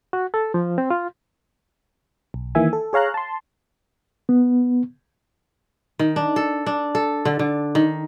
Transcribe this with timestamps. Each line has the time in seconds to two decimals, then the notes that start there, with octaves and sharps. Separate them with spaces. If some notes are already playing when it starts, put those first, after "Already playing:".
0.13 F#4
0.34 A4
0.54 F3
0.78 C4
0.90 F4
2.34 B1
2.55 D#3 E3 A#3 E5 G#5
2.73 A4
2.93 G#4 C#5 F5 A#5 F#6
3.14 A5 C6
4.29 B3
5.99 D#3
6.16 D4
6.36 A4
6.66 D4
6.95 A4
7.25 D3
7.39 D3
7.75 D#3